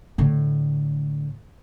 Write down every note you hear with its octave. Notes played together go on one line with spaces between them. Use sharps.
A2 D3